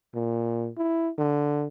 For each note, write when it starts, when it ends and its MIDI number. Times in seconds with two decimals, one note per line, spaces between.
0.15 0.69 46
0.77 1.10 64
1.18 1.67 50